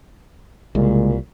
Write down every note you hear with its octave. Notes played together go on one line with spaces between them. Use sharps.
C2 A#2 C#3 G#3